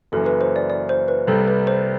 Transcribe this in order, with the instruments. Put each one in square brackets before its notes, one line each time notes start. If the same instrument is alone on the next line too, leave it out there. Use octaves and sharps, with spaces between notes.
[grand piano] F#1 F#2 E3 [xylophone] A4
[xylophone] B4
C5
D5
D5
C5
B4
[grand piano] C2 C3 G3 [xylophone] A4
[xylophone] B4
C5